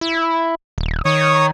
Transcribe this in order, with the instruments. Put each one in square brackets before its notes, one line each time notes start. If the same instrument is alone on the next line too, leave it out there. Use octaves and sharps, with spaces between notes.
[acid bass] E4
D#1
[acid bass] D#3 [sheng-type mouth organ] C#5 C#6 D#6